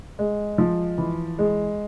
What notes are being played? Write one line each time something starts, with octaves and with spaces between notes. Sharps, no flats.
G#3
F3
E3
G#3